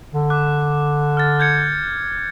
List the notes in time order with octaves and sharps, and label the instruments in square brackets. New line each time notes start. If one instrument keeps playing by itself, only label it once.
[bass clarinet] D3
[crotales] D6 F#6
F6 A6
G6 G#6 C#7